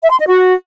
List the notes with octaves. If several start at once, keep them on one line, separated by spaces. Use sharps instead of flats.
E5
C6
D#5
F#4